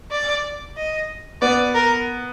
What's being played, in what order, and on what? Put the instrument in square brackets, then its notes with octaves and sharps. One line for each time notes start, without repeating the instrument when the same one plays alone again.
[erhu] D5
D#5
[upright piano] B3 [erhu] D5
[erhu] A#4